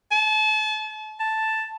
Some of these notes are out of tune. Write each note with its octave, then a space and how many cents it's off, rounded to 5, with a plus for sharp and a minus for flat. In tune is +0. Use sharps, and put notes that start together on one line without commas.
A5 -40
A5 +0